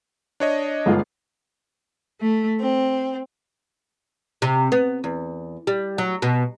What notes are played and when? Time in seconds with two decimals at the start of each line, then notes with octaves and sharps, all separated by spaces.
0.40 D4 C#5 D#5
0.86 G1 G#2 F4
2.21 A3
2.60 C4
4.42 C3
4.72 B3
5.04 E2
5.67 G3
5.98 F#3
6.22 B2